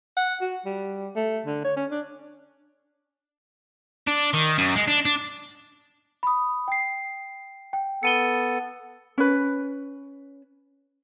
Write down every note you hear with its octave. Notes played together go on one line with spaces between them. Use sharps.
F#5
F#4
G3
A3
D3
C#5
C#4
D4
D4
D#3
F#2
G#3
D4
D4
B5 D#6
G5 C7
G5
B3 A4 C#7 D#7 G7
C#4 B4